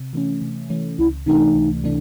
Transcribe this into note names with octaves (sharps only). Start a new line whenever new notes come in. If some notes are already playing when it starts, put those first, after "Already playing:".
Already playing: C3
E3 A3 C#4
C3
E3 A3 C#4
C#2 E4
C3 E3 A3 D4 D#4
C#2
C3 E3 A3 D4